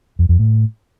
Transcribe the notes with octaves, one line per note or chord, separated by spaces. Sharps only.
F2
F2
A2